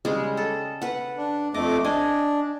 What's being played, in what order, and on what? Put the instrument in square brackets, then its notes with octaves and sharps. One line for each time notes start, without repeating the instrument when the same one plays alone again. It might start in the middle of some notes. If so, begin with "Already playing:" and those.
[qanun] C#3 G3 G#3
A4
B4 F#5
[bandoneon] D4
[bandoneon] F2 A3 D6 [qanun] D#5
[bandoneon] D4 [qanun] D#5 G#5